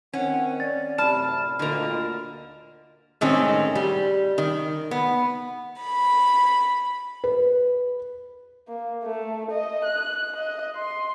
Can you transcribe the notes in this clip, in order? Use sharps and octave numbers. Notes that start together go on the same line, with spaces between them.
D#3 C4 C#4 F#5
D5 A6
F#2 A2 C3 A5 B5 F6 E7
D2 A#2 D3 A#4 D#5
A2 D#3 G#3 C4 C#4
G3
D#3
B3
B5
B4
A#3
A3
D#5
F#6
D#5
C6